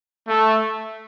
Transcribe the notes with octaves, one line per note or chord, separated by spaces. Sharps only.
A3